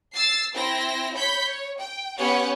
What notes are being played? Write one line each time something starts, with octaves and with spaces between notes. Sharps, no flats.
E6 A6 C7
C4 E4 G5 A#6
C#5 B5 G6 B6
C#5
G5
B3 C#4 G4 C#5 F#5